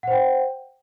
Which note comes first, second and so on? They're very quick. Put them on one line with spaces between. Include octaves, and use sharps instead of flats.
F#5 C5 G5